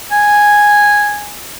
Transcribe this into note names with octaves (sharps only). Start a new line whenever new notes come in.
G#5